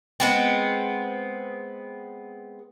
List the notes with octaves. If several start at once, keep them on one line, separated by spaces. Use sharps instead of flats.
G#3 B3 C4